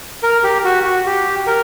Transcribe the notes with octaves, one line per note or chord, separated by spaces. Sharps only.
A#4
G4
F#4
F#4
G4
A#4